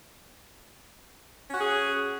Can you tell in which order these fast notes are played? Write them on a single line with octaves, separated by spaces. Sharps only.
C#4 F#4 G#4